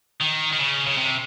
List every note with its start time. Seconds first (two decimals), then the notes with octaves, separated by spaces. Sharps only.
0.21 D#3
0.53 D#3
0.59 C#3
0.87 C#3
0.97 C3